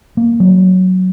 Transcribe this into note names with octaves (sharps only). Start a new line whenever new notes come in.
A#3
F#3